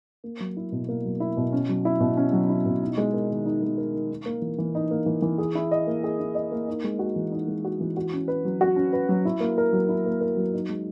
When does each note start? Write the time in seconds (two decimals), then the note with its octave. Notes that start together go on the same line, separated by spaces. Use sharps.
0.24 A#3
0.40 F#3
0.57 E4
0.72 B2
0.89 A#3
1.04 F#3
1.20 E4
1.37 B2
1.52 C#4
1.69 F#3
1.85 E4
2.00 B2
2.17 C#4
2.33 F#3
2.49 E4
2.66 B2
2.82 D#4
2.98 G#3
3.13 A#4
3.30 D#3
3.45 D#4
3.62 G#3
3.78 A#4
3.94 D#3
4.11 D#4
4.26 A#3
4.42 E3
4.58 E3
4.75 D#4
4.91 A#3
5.06 E3
5.22 E3
5.38 G#4
5.55 E4
5.71 D#5
5.87 A#3
6.04 G#4
6.20 E4
6.35 D#5
6.52 A#3
6.68 D#4
6.84 G#3
6.99 F#4
7.16 E3
7.32 D#4
7.48 G#3
7.65 F#4
7.80 E3
7.97 F#4
8.13 C#4
8.28 B4
8.45 F#3
8.61 F#4
8.76 C#4
8.93 B4
9.09 F#3
9.25 E4
9.40 A#3
9.58 A#4
9.73 F#3
9.89 E4
10.06 A#3
10.21 A#4
10.37 F#3
10.53 D#4
10.69 G#3